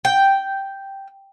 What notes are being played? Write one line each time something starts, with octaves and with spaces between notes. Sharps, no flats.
G5